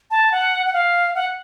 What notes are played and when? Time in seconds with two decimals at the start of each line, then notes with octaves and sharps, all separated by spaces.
0.11 A5
0.32 F#5
0.66 F#5
0.73 F5
1.15 F#5